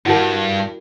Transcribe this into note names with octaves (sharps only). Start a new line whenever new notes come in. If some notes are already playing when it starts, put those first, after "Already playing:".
G2 E4 F#4 A#4 F#5 A5